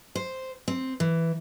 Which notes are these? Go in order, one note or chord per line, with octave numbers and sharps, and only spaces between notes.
C5
C4
E3